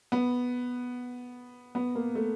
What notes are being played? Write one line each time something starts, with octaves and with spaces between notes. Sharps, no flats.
B3
B3
A#3
A3